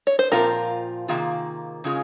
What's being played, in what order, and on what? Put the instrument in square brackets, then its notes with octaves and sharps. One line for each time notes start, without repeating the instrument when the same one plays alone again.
[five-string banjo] C#5
C5
[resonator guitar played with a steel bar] A#2 F3 C4 F4 [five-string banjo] A#4
[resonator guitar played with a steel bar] C3 D#3 A#3 F4 G#4
C#3 G#3 C#4 F4 G#4